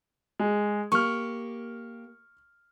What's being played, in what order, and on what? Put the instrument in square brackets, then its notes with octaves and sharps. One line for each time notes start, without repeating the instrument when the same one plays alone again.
[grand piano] G#3
[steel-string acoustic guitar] A#3 G4 [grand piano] C#6 F6